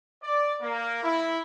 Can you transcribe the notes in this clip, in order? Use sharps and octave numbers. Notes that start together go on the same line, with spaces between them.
D5
A#3
E4